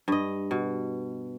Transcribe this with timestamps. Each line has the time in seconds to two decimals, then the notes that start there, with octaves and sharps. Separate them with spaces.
0.08 G2 D#5
0.51 B2